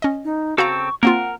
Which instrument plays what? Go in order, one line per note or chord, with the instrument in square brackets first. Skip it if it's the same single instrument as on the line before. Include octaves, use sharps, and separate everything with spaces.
[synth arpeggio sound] C#4 D#5
[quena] D#4
[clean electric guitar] C#3 C4 A4 [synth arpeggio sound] F#4 F5 A#5 [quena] C#6
[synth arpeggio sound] A#3 C4 F4 [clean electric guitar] A#4 [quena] F#5